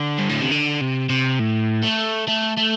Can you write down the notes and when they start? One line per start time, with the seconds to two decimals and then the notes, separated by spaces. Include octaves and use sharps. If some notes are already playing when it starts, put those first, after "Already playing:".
Already playing: D3
0.19 G2
0.29 A2
0.41 C3
0.51 D3
0.81 C3
1.10 C3
1.39 A2
1.83 A3
2.28 A3
2.57 A3